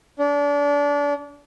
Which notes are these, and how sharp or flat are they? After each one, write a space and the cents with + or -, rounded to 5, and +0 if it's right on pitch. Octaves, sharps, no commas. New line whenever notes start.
D4 -30